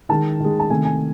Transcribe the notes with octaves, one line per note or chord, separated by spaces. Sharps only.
D#3 G#3 A5
D#3 G#3
A5
C3 D#3 A3 G#5
G#5